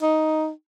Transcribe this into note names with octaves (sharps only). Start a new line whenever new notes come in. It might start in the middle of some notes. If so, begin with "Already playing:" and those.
D#4